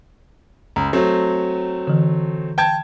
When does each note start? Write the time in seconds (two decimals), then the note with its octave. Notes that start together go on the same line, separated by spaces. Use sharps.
0.76 C#2 A#5
0.93 F#3 A3 C4
1.87 D3 E3
2.58 G5 A5 G#6